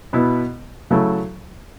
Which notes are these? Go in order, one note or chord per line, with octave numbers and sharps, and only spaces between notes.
B2 B3 E4
C#3 F#3 A3 E4 A4